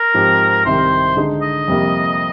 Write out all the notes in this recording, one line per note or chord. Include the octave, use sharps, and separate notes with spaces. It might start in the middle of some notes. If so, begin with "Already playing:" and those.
Already playing: A#4
G#2 F3 C4 G4
C2 C3 D#3 C5
D3 G#3 D#4
D#5
F2 C3 G3 A#3